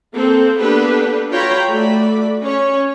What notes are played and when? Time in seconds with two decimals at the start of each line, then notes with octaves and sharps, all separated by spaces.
0.13 A#3 C4 A4
0.59 A#3 B3 D4 G4 A4 B4
1.30 F4 F#4 C#5 G5 A#5 B5
1.69 A3 F#4 D5 B5
2.43 C#4 C#5